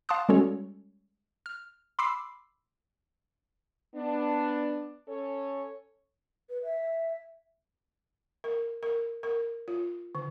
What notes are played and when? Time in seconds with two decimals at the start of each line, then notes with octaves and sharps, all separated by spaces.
0.09 F5 A5 C6 D6 D#6 F#6
0.29 G3 G#3 C#4 F#4 A4 C#5
1.46 F6
1.99 B5 C6 D6 E6 C7
3.95 B3 D4
5.08 C#4 A4 C#5
6.49 B4
6.63 E5
8.44 A#4
8.83 A#4
9.23 A#4
9.68 F4
10.15 D3